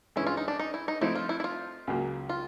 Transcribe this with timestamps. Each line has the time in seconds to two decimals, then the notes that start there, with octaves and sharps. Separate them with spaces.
0.16 G2 E3 G#3 C#4 E4
0.27 F4
0.37 D#4
0.48 D4
0.60 D#4
0.74 E4
0.88 D#4
1.01 F3 A3 C4 D#4 E4
1.15 F4
1.29 E4
1.40 E4
1.44 F4
1.87 C#2 C#3 F#3 A#3
2.29 F4